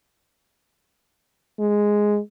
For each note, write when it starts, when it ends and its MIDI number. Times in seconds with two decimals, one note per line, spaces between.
1.60 2.19 56